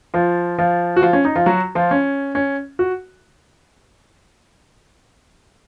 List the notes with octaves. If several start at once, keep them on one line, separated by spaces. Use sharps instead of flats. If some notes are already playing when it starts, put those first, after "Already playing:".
F3 F4
F3 F4
F#4
F3 F4
C#4
D#4
F3 F4
F#3 F#4
F3 F4
C#4
C#4
F#4